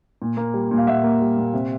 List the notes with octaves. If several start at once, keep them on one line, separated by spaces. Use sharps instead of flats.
A#2
A#3
G3
A#2
F5
A#2 E5 F#5
A#3
G3
A#2
C3